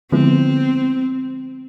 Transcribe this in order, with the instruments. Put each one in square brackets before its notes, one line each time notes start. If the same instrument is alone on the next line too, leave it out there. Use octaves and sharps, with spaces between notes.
[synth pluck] D3 F3 G#3 B3 E4 [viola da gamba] C4